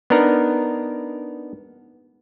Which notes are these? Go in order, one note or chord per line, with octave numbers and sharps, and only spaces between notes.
B3 D4 D#4 A#4